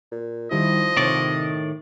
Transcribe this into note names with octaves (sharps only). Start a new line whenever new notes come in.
A#2
D#3 F3 G3 E4 D#5
A2 C3 D#3 C#5 D5